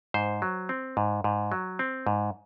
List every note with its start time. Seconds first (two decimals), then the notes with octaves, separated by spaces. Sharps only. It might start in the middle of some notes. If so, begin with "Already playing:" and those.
0.14 G#2 C5
0.42 F#3
0.69 C4
0.97 G#2
1.24 G#2
1.52 F#3
1.79 C4
2.07 G#2